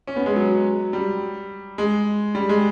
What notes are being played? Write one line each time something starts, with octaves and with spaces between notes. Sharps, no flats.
C#4
B3
G#3
F#3
G3
G#3
G3
G#3